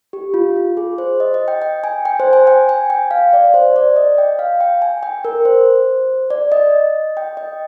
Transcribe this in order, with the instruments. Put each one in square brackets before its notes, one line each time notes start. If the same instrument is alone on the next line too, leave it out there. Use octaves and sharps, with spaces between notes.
[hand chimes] G4
F4
F4
G#4
C5
D#5
D#5
G5
G5
G#5
G5
C5
G#5
G5
G#5
G5
F5
D5
C5
D5
D#5
G5
F5
G5
G#5
G5
A#4
C5
D5
D#5
G5
D#5